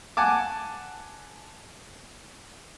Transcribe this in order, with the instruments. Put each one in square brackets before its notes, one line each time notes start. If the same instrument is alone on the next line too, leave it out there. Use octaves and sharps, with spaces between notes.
[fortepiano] F#5 G#5 A5 D6